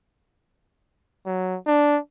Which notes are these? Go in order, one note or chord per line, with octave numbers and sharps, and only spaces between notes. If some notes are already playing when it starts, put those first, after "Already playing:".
F#3
D4